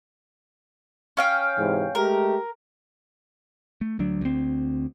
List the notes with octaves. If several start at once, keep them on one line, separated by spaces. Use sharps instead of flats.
C#4 F5 G5
G#2 C3 E3
G#3 A3 G4 A#4
A3
D2 F#3 D4
D2 C4